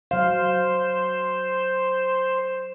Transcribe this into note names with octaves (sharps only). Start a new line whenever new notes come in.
F#3 C5 F5